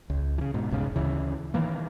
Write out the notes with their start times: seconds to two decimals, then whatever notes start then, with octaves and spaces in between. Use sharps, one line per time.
0.10 C#2
0.38 C#3 E3
0.54 G#2 B2
0.70 E1 C2 G#2 C#3
0.95 D2 C#3 E3
1.54 D#3 E3 A#3